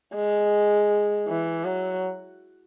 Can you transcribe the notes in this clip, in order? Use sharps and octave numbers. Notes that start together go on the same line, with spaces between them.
G#3
E3
F#3